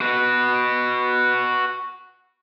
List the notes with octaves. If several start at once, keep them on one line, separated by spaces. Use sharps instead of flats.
F#4 B4